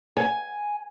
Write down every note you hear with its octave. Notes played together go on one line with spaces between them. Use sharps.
G#5